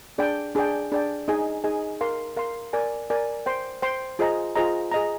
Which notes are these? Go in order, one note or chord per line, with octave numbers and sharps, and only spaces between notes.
D4 G#4 D5 G5
D4 G#4 D5 G5
D4 G#4 D5 G5
D#4 G#4 D#5 G#5
D#4 G#4 D#5 G#5
A#4 F5 C6
A#4 F5 C6
A#4 D5 G#5
A#4 D5 G#5
C5 G5 C6
C5 G5 C6
F4 G#4 C5 D#5 A#5
F4 G#4 C5 D#5 A#5
G#4 D#5 A#5